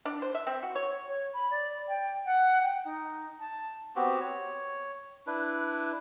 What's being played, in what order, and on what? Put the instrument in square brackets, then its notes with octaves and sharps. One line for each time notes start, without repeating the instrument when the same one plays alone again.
[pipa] D4
C5
E5
C4
F#4
C#5
[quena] C#5
B5
D5
G5
F#5
G5
D#4
A5
[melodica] B3 C4 F#4 G4
C#5
D4 E4 B4